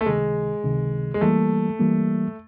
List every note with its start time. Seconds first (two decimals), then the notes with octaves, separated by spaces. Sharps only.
0.01 A3
0.06 C#2 C3 D#3 G#3
0.64 C#2 C3 D#3
1.14 G#3
1.21 E3 G3 A3 A#3
1.80 E3 G3 A#3